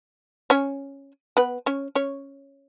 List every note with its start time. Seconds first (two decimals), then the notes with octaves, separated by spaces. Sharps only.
0.50 C#4 C#5
1.37 B3 B4
1.66 C#4 C#5
1.95 C#4 C#5